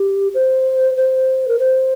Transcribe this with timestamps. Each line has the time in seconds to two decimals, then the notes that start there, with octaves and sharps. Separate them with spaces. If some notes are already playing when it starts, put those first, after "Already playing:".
Already playing: G4
0.34 C5
0.97 C5
1.48 A#4
1.59 C5